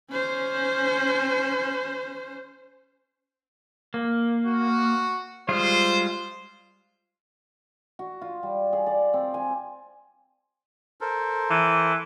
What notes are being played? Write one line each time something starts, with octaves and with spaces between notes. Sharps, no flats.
C#4 C5
A#3
F#4
G3 G#3 F4 C5
F#4
F4
G3
G#4
D5
C4
G#5
A4 A#4 C5
E3